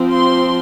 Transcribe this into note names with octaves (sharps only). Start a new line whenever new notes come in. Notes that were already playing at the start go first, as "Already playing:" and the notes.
Already playing: F3 C4
C6